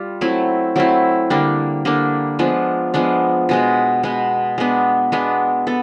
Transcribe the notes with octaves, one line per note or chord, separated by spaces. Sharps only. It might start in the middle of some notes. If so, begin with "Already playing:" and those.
Already playing: G3 F4
F#3 A3 C4 E4
F#3 A3 C4 E4
D3 G3 A#3 D4
D3 G3 A#3 D4
F3 G#3 B3 D4
F3 G#3 B3 D4
B2 G#3 B3
B2 G#3 B3
G#3 B3 D4
G#3 B3 D4
B3 A4